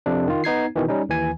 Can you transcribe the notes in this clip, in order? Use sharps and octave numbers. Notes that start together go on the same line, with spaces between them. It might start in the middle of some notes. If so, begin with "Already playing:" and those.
F2 C3 D4
D#3 F4
B3 D#4 G#6 C7
B2 D#3 E3
G3 C#4 D#4
D#2 E3 G#5